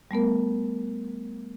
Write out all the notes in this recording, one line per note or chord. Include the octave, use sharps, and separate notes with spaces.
G3 A3 B3 A#4